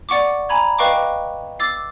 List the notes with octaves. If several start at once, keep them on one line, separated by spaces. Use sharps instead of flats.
D5 F#5 C#6 D6
G#5 A#5 B5 G#6
B4 D#5 F5 G5 C#6 D6
D6 E6 A6 C7